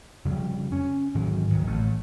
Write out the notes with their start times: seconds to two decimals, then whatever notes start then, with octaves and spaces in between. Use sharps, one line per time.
0.25 F2 C#3 G3
0.72 C#4
1.15 G#2 D#3 E3 F#3
1.50 D2 D#3 F#3
1.67 A1 A3